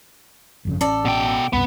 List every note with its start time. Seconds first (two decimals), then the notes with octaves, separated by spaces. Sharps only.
0.65 G1 F2 C#3
0.81 A1 C#4 A4 D5
1.05 B2 G5
1.53 C2 F#2 C3 B3